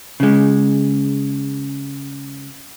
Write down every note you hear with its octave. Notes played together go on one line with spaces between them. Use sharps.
C#3 G#3